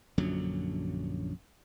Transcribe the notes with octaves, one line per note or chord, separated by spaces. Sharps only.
A#1 F#2 D3 F#3